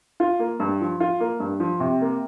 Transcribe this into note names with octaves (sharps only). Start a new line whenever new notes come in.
F4
A#3
G2
F3
F4
A#3
G2
F3
C3
A#3